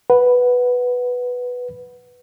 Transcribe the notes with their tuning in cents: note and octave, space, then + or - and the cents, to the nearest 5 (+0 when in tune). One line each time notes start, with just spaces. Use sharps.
B4 +0 F#5 +0